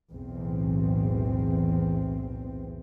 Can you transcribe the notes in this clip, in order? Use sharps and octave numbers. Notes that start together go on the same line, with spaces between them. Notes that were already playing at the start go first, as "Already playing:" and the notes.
B1 E2 A2 C4